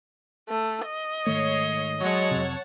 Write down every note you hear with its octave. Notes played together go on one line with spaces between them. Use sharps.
A3
D#5
G#2 D#3 A3 C#5 C7
F#3 G#3 C#5 F#5 A5
F2 C3